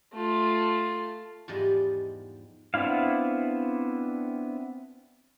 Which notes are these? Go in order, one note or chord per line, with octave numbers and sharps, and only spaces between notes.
A3 F4
E2 G#2 F3 G3 D5 D#5
B3 C4 D4 E4 F5